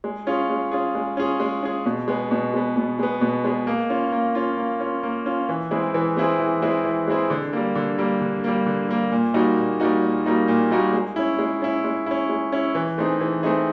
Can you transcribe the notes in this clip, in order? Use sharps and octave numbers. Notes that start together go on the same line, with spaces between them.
G#3
C#4 F4 G#4
G#3
C#4 F4 G#4
G#3
C#4 F4 G#4
G#3
C#4 F4 G#4
B2
G#3 B3
B2
G#3 B3
B2
G#3 B3
B2
G#3 B3
A#3
C#4 F4
A#3
C#4 F4
A#3
C#4 F4
A#3
C#4 F4
E3
G#3 C4 E4 G#4
E3
G#3 C4 E4 G#4
E3
G#3 C4 E4 G#4
E3
G#3 C4 E4 G#4
D3
G3 A#3
D3
G3 A#3
D3
G3 A#3
D3
G3 A#3
A#2
G3 A#3 D#4 F#4
A#2
G3 A#3 D#4 F#4
A#2
G3 A#3 D#4 F#4
A#2
G3 A#3 D#4 F#4
G#3
C#4 E4
G#3
C#4 E4
G#3
C#4 E4
G#3
C#4 E4
E3
A3 C4 D#4 G#4
E3
A3 C4 D#4 G#4